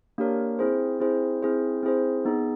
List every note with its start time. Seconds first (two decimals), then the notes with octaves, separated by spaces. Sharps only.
0.18 A#3 D4 G4 A#4 C#5
0.59 C4 E4 G#4 C5
1.00 C4 E4 G#4 C5
1.43 C4 E4 G#4 C5
1.83 C4 E4 G#4 C5
2.25 B3 D#4 G#4